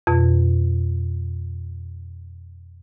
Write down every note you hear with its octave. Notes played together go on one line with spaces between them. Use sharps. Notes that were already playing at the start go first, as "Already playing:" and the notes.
F2 B2